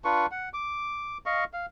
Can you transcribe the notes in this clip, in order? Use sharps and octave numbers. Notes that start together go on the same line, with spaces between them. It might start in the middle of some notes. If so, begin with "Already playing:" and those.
D4 F4 B4 C#6
F#5
D6
D#5 F5 C#6
F5